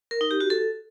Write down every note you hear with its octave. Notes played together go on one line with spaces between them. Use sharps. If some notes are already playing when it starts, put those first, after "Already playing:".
A#4
D#4
G4
F#4
A4